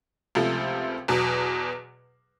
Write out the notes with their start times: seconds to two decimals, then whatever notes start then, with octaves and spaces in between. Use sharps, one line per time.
0.35 C#2 C3 F3 A3
1.08 E2 B2 F#3